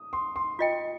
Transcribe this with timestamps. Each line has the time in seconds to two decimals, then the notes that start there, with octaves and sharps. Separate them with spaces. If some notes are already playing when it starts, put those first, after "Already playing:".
Already playing: D#6
0.13 C6
0.36 C6
0.59 F4 D#5 G5